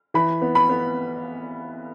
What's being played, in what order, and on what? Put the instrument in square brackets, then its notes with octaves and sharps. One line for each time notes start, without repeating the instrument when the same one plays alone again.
[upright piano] E3 B5
B3
B5
B3